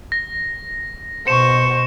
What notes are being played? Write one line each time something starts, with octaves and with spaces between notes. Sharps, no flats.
A#6
B2 C5 C#6 C#7 E7